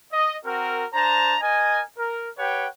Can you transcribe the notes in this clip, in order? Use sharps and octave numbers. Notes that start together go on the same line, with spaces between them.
D#5
C4 F#4 A#4
D4 C5 A5 A#5
A#4 D#5 G#5
A#4
G4 B4 C#5 F#5 G5